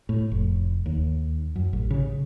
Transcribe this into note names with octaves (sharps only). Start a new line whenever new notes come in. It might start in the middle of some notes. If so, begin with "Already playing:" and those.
A2
F1
D#2
F#2
A1
C#3